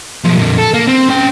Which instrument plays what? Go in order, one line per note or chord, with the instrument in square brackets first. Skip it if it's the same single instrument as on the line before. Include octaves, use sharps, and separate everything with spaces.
[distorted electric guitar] B1 F3
F2 A#2
A4
A#3
C4
C#4 G5